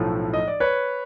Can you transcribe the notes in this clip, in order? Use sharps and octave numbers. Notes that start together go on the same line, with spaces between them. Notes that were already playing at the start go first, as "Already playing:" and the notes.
Already playing: B1 A2 F3 A3
D#5
D5
B4 C#5